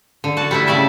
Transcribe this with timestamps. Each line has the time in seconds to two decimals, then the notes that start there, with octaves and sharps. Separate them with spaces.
0.24 D3
0.37 F#4 A5
0.51 G3 A3 E4
0.67 C#3 A3 D5 E5 A5